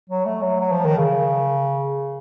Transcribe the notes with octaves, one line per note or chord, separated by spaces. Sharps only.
F#3
A3
F#3
F#3
F3
D#3
C#3